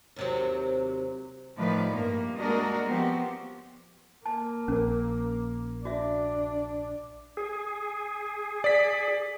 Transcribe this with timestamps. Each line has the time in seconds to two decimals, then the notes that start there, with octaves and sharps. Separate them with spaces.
0.16 D#2 C3 F#3
1.56 A2 D#3 F3 B4 D5
1.91 G2 A#3
2.37 G#3 A#3 D4 F#4 A#4 D#5
2.85 F3 B3 C4 F#4 G4
4.26 A#3 A5
4.68 A#1 C#4 A#4
5.85 D4 F#4 E5
7.37 G#4
8.64 D5 B6